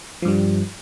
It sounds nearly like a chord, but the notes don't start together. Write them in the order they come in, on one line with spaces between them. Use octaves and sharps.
F3 G2 G3